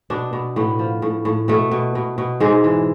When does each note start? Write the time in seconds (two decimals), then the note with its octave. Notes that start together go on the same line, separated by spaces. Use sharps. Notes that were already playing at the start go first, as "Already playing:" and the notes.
0.10 B2 D4
0.33 B2
0.56 A2 B3
0.79 F3
1.02 A2
1.25 A2
1.48 B2 A3
1.71 B2
1.95 B2
2.18 B2
2.40 G#2 G#3
2.64 E3